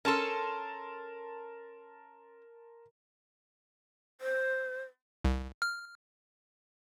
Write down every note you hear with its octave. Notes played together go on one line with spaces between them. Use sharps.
C#4 A4 A#4 A5 C6
C5
C2
F6